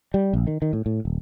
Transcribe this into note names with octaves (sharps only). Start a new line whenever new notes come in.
G3
A#1
D#3
D#3
A2
A2
D#1